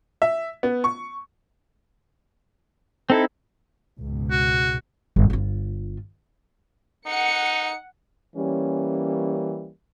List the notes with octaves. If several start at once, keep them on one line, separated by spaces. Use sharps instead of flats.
E5
B3
C#6
C4 D#4 E4 A4
C#2 G#2 B2
F#4
G1
G1 F4
D#4 F#5 C#7
E3 G3 A#3 C#4